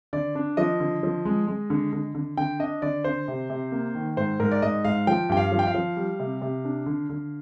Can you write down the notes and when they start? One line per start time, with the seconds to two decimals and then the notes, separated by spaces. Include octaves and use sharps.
0.13 D3 D5
0.35 D4
0.57 F3 D#5
0.80 D3
1.03 F3
1.25 G#3
1.47 G#3
1.70 D3
1.93 D3
2.15 D3
2.37 D3 G5
2.59 D4 D#5
2.82 D3 D5
3.04 D3 C5
3.28 C3
3.50 C3
3.72 A#3
3.95 D#3
4.17 G#2 C5
4.40 G#2 A#4
4.52 D5
4.62 G#2 D#5
4.85 G#2 F5
5.07 F3 G5
5.29 G2 G5
5.37 F5
5.51 F3
5.59 G5
5.67 F5
5.75 F3
5.97 G3
6.20 C3
6.42 C3
6.65 D4
6.86 D3
7.10 D3